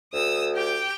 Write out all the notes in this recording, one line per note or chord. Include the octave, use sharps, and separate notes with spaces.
D2 D#6 E6
G4 G5